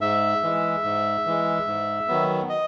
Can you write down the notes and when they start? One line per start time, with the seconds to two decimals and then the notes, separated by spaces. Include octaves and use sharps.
0.01 G#2 E5
0.43 E3 G#3
0.84 G#2
1.26 E3 G#3
1.67 G#2
2.08 D#3 F#3 B3
2.49 D#5